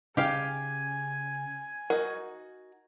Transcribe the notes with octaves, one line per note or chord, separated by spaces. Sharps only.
C#3 G4 F5 G5 G#5
D#4 F#4 A#4 F#5